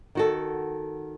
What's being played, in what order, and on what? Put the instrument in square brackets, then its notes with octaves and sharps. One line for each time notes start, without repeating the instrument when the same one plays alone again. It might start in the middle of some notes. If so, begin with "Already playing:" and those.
[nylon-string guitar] D#3 F#4 A4